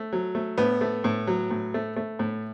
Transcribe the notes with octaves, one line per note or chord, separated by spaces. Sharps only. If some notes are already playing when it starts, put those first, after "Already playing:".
Already playing: A3
F#3
A3
A2 B3
A3
A2
F#3
A2
A3
A3
A2